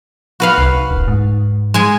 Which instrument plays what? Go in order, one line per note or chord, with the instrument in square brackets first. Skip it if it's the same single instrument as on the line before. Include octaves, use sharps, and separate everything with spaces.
[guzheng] F#4 B4 F5
[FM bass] C2
D#1
G#2
[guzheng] G#3 G#5